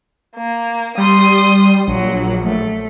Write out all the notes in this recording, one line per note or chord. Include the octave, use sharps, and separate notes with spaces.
A#3
G3 C6 D#6
A#1 F#3
A3